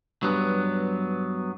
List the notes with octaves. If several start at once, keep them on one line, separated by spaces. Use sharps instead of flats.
G2 F#3 B3